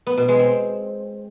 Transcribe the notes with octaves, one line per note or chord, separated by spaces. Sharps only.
B3
B2
G#3
C4